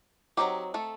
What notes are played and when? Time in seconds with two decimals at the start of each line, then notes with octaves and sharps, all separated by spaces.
0.37 F#3 G3 C4 D#4 G4
0.74 A3 A4